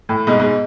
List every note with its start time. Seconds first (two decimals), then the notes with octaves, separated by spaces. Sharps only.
0.09 A2
0.27 G#2 B2
0.40 G#2 B2